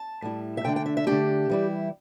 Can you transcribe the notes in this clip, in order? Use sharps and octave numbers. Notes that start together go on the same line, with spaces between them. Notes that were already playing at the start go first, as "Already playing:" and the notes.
Already playing: A5
A2 G3 E4
E5
D3 A3 D4 G5
G5
E5
E5
D3 A3 D4 G4
E3 G3 E4